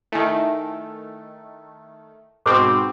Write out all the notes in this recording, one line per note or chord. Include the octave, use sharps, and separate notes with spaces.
D#3 A3 E4 G#5
G#2 B2 C4 G#4 B4 D6